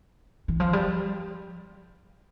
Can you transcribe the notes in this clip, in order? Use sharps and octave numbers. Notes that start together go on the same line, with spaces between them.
E3
F3
G3